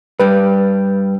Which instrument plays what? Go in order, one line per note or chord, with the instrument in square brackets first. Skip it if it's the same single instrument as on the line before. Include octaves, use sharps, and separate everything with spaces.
[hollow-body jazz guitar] G2 G3 [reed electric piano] B4